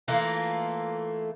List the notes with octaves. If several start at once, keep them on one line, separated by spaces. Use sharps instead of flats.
E3 A3 A#3 F4